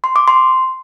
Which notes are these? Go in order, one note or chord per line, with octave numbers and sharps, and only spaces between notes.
C6
D6
C6